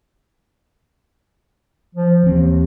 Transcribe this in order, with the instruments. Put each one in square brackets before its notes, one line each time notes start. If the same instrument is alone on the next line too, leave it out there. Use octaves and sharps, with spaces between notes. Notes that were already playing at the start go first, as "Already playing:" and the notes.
[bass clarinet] F3
[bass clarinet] D#2 [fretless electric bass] E3 C4